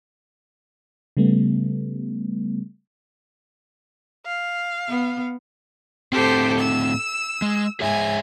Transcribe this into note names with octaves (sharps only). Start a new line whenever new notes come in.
C#3 G3 A3 B3
F5
B3
A2 C4 G4 A4 C5
E6
G#3
G#2 G#4 C#5 E5 G#5